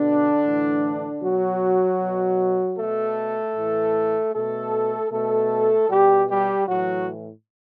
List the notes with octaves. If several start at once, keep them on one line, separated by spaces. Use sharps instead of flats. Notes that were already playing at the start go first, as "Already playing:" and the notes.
Already playing: B2 D3 D4
A2 E3
B2 F#3 F#4
B2
B2 A3 A4
A2 E3
B2 A3 A4
B2 A3 A4
B2 G3 G4
G3 G4
A2 E3 F#3 F#4